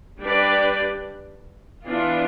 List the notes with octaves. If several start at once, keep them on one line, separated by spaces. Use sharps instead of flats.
G3 D4 G4 B4 D5
E3 B3 D4 F4